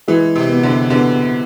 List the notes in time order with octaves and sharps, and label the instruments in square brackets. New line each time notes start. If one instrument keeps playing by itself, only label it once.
[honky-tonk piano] E3 [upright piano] G#3
[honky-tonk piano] C3
[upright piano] B3
[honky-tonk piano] D3
[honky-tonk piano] D3 [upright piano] B3